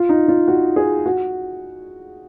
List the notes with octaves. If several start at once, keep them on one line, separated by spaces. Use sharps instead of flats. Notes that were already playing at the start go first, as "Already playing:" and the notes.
Already playing: F4
D#4
F4
F#4
G#4
F#4